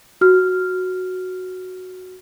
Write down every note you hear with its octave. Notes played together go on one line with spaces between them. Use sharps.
F#4 F6